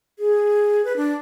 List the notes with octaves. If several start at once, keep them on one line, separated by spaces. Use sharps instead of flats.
G#4
B4
D4